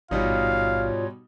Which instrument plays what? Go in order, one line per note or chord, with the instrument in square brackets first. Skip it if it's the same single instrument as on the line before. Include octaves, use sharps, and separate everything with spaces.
[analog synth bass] A1 [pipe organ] G#2 F4 C#5 [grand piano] B2 G3 D#4 [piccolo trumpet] F5